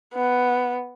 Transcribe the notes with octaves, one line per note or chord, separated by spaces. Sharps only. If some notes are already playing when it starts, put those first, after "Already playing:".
B3